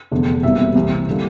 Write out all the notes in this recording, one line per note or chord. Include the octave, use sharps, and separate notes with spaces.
F1 E2 D3
E1 E2 C3 G3 A#3 E5
C2 C3 E3
D3 G3 A#3